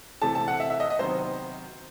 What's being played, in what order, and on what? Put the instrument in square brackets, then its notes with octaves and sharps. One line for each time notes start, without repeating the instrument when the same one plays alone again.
[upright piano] C3 E3 A3 A5
A5
F#5
E5
E5
D#5
D#5
C3 D#3 F#3 B3 C5